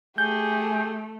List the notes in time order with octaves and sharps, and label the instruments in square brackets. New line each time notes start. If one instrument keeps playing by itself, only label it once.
[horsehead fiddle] A3 [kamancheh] G4 G#4 [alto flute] G#5 [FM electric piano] G6